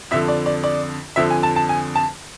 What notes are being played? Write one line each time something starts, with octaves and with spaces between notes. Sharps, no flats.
F2 D3 F3 E5
D5
D5
D5
F2 D3 F3 E5
G#5
A5
A5
G#5
A5